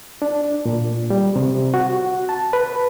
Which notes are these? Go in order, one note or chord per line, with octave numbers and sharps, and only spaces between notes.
D4
A#2
G3
C3
F#4
A5
B4